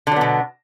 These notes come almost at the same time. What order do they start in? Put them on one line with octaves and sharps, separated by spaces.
D3 F#3 B3 B2